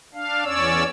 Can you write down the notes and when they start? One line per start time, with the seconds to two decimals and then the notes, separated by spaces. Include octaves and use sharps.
0.14 D4 F5
0.44 E2 C#4 C#5 D5 E6